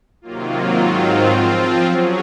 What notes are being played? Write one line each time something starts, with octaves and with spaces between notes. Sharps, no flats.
C3 D#3 F#3 A#3 F4
G#2 D#3 F#3 C4 F4
F3 C4 F4
F#3 C#4 G#4